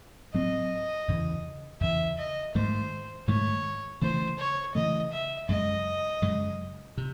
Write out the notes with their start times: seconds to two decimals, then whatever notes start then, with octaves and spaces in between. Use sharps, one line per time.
0.34 A2 F#3 C4 D#5
1.08 E2 C#3 E3
1.81 E2 C#3 E3 E5
2.18 D#5
2.55 G#2 D#3 A3 C5
3.28 G#2 D#3 A3 C#5
4.02 C#3 E3 A3 C5
4.39 C#5
4.75 C#3 E3 A3 D#5
5.12 E5
5.49 F#2 C#3 G#3 D#5
6.22 F#2 C#3 G#3
6.97 C3